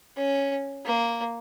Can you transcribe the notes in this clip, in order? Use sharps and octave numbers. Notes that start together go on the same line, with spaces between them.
C#4
A#3